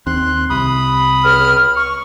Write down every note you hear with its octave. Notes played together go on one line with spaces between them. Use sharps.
D#2 C4 C6 F#6
C2 C3 B5 D#6
C#2 F6
C#6